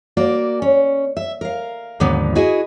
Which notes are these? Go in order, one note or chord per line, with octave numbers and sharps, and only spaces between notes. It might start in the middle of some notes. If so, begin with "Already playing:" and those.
A#3 F#4 D5
C#4
E5
A#4 F5
D#2 G#2 D3 F3 B3
E4 F#4 G#4 D#5